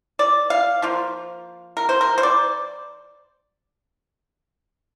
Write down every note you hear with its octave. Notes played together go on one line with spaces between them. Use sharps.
D5
F5
F3 A#3 F4
A#4
C5
A#4
C5
D5